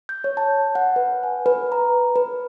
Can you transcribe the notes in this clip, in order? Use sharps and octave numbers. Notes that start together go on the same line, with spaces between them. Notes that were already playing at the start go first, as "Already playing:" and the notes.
G6
C#5
A5
F#5
B4
G#5
B4
A#5
B4